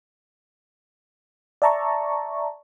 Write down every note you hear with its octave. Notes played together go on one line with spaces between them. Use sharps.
D5 E5 A5 A#5 C#6